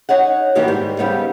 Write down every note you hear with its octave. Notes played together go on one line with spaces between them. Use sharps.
D#4 C#5 D#5 F#5
B2 D#3 E3 A#3 D#4 G4
G#2 G3
C#3 G3 B3 C4 D#4